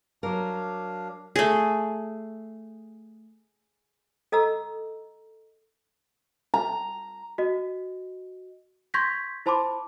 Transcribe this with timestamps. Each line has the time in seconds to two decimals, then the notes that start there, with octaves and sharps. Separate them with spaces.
0.23 F#3 D4 A#4 F5
1.36 A3 G#4
4.32 A4 D#5 A#5 E6
6.54 A#5
7.38 F#4 D#5
8.94 C6 C#6 G6 G#6 A#6 B6
9.46 E4 C5 A5 B5 C6 D6